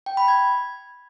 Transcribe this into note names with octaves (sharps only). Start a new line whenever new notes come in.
G5
B5
G#6